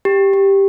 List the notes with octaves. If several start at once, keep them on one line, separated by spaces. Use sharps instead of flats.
G4
G4